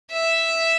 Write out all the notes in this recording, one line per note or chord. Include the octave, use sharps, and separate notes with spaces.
E5